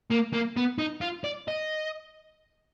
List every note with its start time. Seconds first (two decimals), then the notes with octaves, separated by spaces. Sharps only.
0.10 A#3
0.33 A#3
0.56 B3
0.78 D#4
1.01 F4
1.24 D5
1.48 D#5